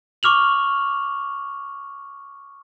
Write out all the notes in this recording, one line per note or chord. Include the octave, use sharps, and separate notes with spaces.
C#6 D6 F6 F7 F#7